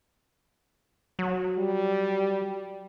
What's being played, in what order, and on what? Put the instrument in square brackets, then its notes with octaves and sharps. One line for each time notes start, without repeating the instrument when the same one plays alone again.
[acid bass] F#3
[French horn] G3